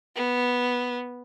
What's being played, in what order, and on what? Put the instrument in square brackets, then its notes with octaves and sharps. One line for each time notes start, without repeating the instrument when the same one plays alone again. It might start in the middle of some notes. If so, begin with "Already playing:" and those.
[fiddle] B3